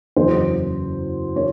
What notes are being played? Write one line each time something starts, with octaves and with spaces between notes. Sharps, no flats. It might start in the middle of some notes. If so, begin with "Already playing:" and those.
F#1 E2 C#3 F#3 C5
C#5